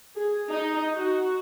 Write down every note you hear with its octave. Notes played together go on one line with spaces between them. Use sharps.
G#4
D#4
F#4